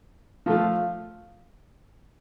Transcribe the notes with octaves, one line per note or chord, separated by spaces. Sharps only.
F3 A3 F4